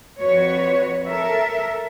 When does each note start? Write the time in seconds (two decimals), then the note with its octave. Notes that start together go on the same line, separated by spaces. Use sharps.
0.22 F2 F#4 B4 C#5
1.09 A4 A#4 E5